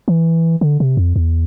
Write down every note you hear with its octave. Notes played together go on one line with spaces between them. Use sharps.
E3
D3
C3
F2
E2